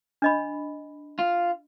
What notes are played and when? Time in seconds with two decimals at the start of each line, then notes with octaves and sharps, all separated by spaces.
0.22 D4 D#5 B5
1.19 F4